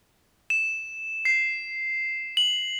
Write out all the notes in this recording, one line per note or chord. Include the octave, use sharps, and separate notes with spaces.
E7
C7
F#7